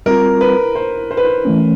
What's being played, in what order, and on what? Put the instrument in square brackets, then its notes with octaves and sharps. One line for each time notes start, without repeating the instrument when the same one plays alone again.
[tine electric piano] G3 C4 F4 [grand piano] A#4
[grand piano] B4
C5
C5
B4
C5
[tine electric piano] E3 A3 C#4